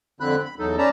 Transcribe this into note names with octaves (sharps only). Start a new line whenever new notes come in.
F2 D3 C4 B5 F#6
B5
E2 F#3 D#4 A4
C#4 B4 D5 A5 A#5